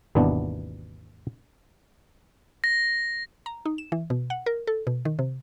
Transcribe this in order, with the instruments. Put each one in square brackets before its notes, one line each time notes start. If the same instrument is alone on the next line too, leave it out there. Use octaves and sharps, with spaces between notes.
[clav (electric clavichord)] G#1 D#2 B2 E3 B3 D4
[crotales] A#6
[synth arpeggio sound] A#5
D#4
E7
E3
B2
F#5
A#4
A4
B2
D#3
C3